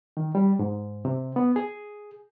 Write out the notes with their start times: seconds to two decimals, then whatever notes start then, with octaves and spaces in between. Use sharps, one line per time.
0.17 D#3
0.35 G3
0.59 G#2
1.05 C3
1.36 B3
1.56 G#4